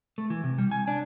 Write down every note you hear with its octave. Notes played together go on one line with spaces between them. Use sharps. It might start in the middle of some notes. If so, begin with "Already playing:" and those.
A3
E3
C3
G3
G#5
D4